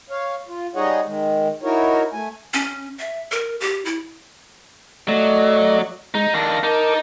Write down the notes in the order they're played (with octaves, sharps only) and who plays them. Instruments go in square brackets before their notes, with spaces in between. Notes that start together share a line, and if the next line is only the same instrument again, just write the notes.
[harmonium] C#5 F5
F4
G3 D#4 G#4 C#5 D#5 F#5
D#3 G#3
D#4 E4 F#4 A#4 C#5
A3 G#5
[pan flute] C#4
E5
A#4
G4
E4
[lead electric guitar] F#3 [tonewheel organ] A3 D5 D#5
[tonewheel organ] G#3 [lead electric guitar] D#4
[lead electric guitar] D#3 D4 [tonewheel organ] F5 A#6
[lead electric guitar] D#4 [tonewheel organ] A#4 A5 D6